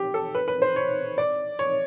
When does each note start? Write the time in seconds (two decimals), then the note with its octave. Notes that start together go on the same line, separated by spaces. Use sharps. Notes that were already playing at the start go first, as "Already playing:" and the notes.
Already playing: G4
0.14 A4
0.35 B4
0.48 B4
0.62 C5
0.76 C#5
1.18 D5
1.59 C#5